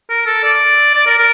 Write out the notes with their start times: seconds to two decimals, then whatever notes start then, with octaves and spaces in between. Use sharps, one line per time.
0.10 A#4
0.26 A4
0.44 D5
0.95 D5
1.07 A#4
1.18 A#4